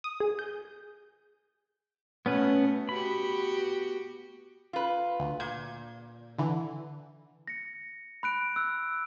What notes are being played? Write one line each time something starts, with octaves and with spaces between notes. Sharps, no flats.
D#6
G#4
G6
B2 A3 B3 C#4 B4
B3 F#4 G4 B5
F4 B4
D2
A#2 G6 G#6
D3 E3
A#6 C#7
B5 F#6 D7
E6 F#6